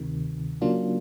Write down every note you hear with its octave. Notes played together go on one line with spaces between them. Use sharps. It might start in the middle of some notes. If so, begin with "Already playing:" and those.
Already playing: D2 C3 D#3
C#3 F#3 A#3 D4 F4